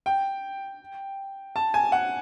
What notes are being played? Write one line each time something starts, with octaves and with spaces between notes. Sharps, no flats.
G5
A5
G#5
F#5